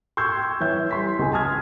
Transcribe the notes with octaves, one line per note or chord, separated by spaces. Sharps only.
C6 C#6 E6 G6 G#6
G5
E3 C#5 E5 G6
G3 C6 B6
C#2 G#4 G#5
A5 C6 D#6 F6 G#6